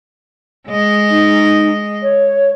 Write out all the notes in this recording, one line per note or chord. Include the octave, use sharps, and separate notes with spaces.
G#3 D#5
D#4
C#5